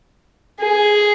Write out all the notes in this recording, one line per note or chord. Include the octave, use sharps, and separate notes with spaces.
G#4